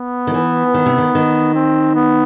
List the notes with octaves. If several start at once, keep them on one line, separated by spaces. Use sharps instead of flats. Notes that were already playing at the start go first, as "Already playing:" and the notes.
Already playing: B3
D#3
E3
D#3
C3
D#3
D#3
C4
B3